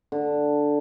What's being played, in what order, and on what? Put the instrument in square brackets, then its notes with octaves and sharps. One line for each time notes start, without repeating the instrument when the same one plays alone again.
[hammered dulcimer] D3